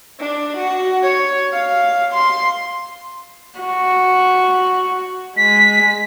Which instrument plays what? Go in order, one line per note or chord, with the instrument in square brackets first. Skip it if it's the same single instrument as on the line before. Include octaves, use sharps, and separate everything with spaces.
[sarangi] D4
F#4
C#5
F5
C6
F#4
[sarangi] G#3 [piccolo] B6